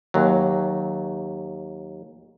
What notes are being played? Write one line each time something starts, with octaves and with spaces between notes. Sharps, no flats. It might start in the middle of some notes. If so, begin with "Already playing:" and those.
D#2 F#3